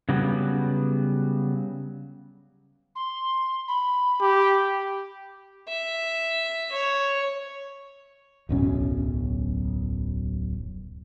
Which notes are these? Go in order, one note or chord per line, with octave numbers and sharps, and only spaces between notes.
C#3 F#3 G3 B3
C6
B5
G4
E5
C#5
D1 B1 F#2 C#4